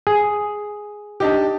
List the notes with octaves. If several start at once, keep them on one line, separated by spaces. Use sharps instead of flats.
G#4
D4 D#4 G4